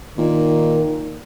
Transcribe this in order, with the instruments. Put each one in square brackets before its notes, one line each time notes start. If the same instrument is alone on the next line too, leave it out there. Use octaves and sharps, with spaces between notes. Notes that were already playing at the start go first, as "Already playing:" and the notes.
[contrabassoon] A#2 [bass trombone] D#3